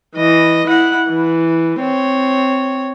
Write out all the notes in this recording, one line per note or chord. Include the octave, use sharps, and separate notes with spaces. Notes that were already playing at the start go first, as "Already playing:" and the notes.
E3 D#5
E4 F#5
E3
C4 C#5